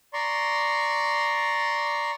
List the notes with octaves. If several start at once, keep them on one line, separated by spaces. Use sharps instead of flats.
D5 A#5 C6 C#6